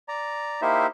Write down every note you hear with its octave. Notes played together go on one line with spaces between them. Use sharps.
D5 A#5
A#3 D#4 E4 G4 C5 E5